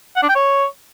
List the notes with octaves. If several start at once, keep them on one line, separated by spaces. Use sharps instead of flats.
F#5
D4
G5
C#5